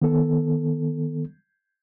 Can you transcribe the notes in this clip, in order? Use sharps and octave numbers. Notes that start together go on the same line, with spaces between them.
D#3 B3 A4